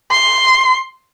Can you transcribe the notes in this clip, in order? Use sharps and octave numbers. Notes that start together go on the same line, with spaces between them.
C6